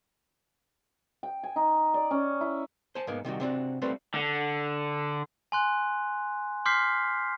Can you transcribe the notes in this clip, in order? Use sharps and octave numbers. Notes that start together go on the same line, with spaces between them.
G5
G#5
D#4
D5
C#4
E4
C5 G#5 A5
G#2 A#3 B3
C3 D#3 G3 F#4
C3 C4 D4 F#4
G3 A3 C4 D4 B4 C5
D3
G#5 C6 F#6
C6 D6 F6 G6 B6 C7